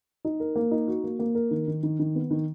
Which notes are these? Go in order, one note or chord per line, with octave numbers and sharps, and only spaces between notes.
D#4
A#4
A#3
D#4
F#4
A#3
A#3
A#4
D#3
D#3
D#3
D#3
B3
D#3